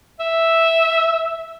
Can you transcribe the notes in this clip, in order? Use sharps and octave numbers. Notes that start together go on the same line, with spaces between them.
E5